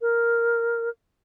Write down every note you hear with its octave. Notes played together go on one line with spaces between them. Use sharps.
A#4